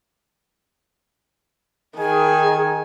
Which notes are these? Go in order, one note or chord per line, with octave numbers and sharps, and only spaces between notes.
D#3 G#4 G#5